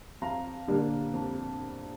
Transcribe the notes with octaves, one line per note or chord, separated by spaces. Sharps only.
F2 F5 A#5
D3 G3 A#3 D4
F2